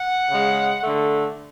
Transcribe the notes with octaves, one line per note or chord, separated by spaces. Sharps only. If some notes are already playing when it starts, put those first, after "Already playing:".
Already playing: F#5
C#3 G#3
D3 A3